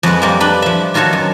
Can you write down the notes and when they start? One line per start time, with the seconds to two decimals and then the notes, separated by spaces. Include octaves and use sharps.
0.03 F2 G#3 B4 F#5
0.22 F2 G3 A#3
0.40 D4 B4 A5 B5
0.62 F3 E5
0.94 D#3 F4 F#4 A4 C#5
1.13 F#2